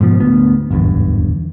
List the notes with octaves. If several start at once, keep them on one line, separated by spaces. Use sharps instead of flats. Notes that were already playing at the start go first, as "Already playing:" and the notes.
G#2 B2 F3
D2 B3
D1 G#1 E2 G2